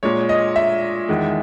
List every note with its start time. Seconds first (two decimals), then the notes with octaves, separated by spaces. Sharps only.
0.03 A#2 G#3 C#5
0.29 D#5
0.56 E5
1.09 E2 D#3 G#3